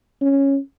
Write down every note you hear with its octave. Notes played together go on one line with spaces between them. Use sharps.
C#4